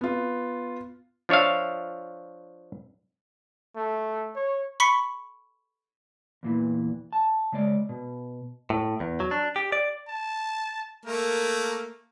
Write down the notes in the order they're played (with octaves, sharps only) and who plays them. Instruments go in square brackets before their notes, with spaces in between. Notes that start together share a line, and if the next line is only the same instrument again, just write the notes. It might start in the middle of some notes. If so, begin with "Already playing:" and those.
[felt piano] B3 F4
[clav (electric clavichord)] F3 D4 C#5 E5 F5
[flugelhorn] A3
C#5
[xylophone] B5 C#6 B6 C#7 G7
[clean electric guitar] E2 A#2 E3
A5
C#3 G#3 D5
B2
A2
E2
F#3
D4
G4
D5
[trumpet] A5
[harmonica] A3 A#3 [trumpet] A#4